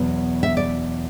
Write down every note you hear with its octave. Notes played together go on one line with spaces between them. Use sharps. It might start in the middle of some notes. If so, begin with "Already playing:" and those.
Already playing: E2 B2 F#3
E5
D5